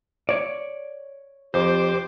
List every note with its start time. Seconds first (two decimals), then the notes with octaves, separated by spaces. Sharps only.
0.29 C#5 D5
1.54 F2 G4 C5 D6